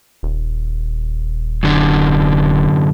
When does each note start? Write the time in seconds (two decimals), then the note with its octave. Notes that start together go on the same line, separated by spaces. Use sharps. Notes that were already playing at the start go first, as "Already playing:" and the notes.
0.23 D#1
1.63 F#2 D3